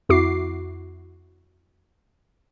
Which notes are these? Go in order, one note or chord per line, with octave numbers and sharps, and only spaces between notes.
F2 E4 F#4 D6 C7